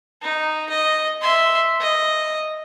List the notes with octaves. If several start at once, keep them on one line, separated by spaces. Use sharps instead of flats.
D#4
D#5
E5 C6
D#5